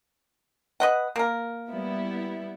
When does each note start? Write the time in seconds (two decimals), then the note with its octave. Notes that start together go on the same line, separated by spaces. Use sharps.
0.80 B4 D#5 F#5
1.16 A#3 A#4
1.71 G3 B3 E4